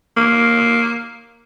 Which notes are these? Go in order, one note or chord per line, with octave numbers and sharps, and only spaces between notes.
A#3